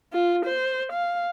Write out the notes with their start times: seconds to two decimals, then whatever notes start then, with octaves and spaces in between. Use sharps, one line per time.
0.13 F4
0.45 C5
0.92 F5